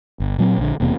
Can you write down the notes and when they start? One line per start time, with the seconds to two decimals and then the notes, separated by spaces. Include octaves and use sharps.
0.20 G1
0.38 A#2 F#3 C4
0.58 A#1 D3
0.80 E1 E2 C3 A#3